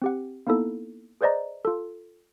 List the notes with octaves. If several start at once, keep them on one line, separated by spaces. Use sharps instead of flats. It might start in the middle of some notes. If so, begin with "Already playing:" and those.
C4 G4 F#5
A#3 B3 D#4 E4 A4
G#4 B4 C5 D5 D#5 A#5
F4 A4